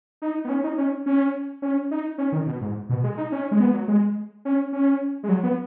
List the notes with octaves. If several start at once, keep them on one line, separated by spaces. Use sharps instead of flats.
D#4
B3
C#4
D#4
C#4
C#4
C#4
D#4
C#4
D#3
B2
G#2
B2
G#3
D#4
C#4
G#3
B3
F#3
G#3
C#4
C#4
G#3
F#3
B3